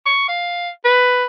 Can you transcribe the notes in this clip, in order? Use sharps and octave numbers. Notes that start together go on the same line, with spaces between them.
C#6
F5
B4